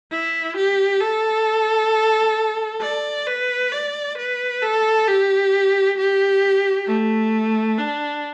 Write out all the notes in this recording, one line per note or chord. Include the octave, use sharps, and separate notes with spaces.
E4
G4
A4
D5
B4
D5
B4
A4
G4
G4
A3
D4